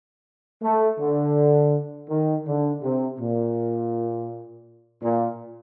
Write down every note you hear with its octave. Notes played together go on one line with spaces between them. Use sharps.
A3
D3
D#3
D3
C3
A#2
A#2